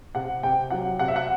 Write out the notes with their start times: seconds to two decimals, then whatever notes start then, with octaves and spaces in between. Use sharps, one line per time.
0.15 C3 F#5
0.43 C3 G5
0.70 F#3 F#5
0.99 C3 F#5
1.08 E5
1.16 F#5